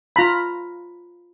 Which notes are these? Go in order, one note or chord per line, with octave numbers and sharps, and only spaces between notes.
F4 A#5 B5